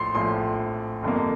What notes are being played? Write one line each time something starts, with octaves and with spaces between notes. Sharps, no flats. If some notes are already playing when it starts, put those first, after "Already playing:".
Already playing: A#1 A2 F3 C6
A#1 A2 F3 C6
G1 F2 D3 F3 A#3